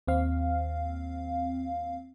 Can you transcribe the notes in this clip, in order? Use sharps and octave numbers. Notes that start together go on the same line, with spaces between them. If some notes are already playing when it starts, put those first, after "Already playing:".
D#2 C4 F5